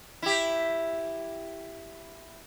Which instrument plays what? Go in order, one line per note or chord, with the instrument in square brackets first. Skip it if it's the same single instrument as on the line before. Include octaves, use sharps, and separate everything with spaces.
[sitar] E4 G4